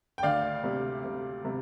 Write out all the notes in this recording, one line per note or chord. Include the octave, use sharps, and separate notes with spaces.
G5
D2 D5 F5
C3
C3
C3